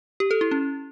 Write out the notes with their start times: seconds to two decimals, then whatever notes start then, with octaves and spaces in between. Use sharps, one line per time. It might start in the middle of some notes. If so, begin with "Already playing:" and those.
0.20 G4
0.31 A4
0.41 E4
0.51 C#4